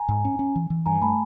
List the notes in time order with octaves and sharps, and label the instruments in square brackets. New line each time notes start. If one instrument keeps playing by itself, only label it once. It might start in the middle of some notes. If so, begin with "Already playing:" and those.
Already playing: [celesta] G#5 A#5
[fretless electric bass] G#2
C#4
C#4
E3
E3
[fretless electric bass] G2 [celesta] G#5 A#5
[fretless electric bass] A3 [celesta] A5 B5